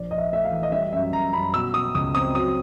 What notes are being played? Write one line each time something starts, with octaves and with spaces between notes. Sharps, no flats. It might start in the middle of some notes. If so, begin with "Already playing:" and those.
Already playing: A#1 D5
A#1 D#5
E5
A3 E5
F5
E3
D#5
G3 E5
F#2 E5
F#2 A#5
F#2 B5
B2 E6
B2 D#6
C#2 D#6
C4 D#6
F#3 D#6